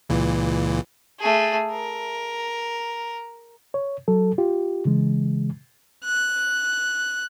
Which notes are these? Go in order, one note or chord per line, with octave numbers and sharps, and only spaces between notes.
C#2 A#2 E3
A3 G#4
A#4
C#5
F#3 A4
F4 G4
C#3 E3 G#3
F#6